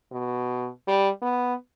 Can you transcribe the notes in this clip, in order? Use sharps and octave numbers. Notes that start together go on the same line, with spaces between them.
B2
G3
B3